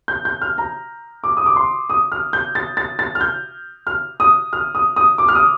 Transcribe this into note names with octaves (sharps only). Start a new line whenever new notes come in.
G6
G6
F6
A#5
D6
D#6
D6
C6
D#6
F6
G6
A6
A6
A6
F6
G6
F6
D#6
F6
D#6
D#6
D6
F6
D#6